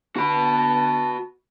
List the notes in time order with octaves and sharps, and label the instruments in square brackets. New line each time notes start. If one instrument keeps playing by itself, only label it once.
[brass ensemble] D3 B3 A5 [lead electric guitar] F#4 B5